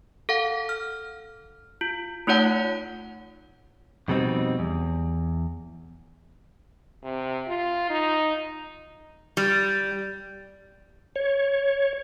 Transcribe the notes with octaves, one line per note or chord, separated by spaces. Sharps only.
A4 F5 F#5
F6
F4
A3 D#4 F4 C#5 F#5 A5
F2 B2 G3 C4 D#4
E2
C3
F4
D#4
G3
C#5